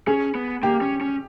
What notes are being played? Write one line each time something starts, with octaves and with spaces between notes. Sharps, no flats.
C#4 G#4
B3
A#3 G4
C#4
C#4